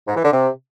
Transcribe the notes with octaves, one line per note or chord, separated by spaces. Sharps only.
G#2
E3
D3
C3